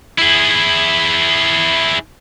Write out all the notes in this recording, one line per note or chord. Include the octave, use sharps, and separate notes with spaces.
E4 G#4